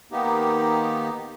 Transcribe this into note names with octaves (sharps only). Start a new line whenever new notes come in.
D#3 A#3 B3 D#4 G4